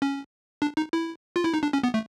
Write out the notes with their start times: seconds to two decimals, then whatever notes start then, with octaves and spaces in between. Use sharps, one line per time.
0.02 C#4
0.62 D4
0.77 D#4
0.93 E4
1.36 F4
1.44 E4
1.54 D#4
1.63 D4
1.73 C#4
1.83 B3
1.94 A3